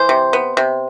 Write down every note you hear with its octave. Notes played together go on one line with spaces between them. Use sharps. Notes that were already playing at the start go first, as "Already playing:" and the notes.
Already playing: E3 C5
C3
B3
C3